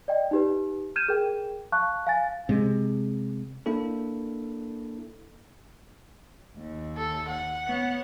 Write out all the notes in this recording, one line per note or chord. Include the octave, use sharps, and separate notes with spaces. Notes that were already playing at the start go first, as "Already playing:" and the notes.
D5 D#5 G5
D#4 G4 B4
F6 G6 G#6 D#7 E7
G#4 A#4 G5
F5 A5 C#6 F#6
F5 G#5 A6
C3 G#3
A#3 D4 E4 A4
D#2
A4
F#5
B3 C#5